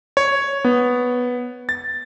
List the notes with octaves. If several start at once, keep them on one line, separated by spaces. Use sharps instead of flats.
C#5
B3
A6